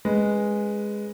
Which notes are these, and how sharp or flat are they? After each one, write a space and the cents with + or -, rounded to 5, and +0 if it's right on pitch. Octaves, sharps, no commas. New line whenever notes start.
G#3 -5 C#4 +0 B4 +0